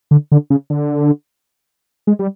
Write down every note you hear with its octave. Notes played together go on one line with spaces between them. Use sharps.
D3
D3
C#3
D3
G#3
G3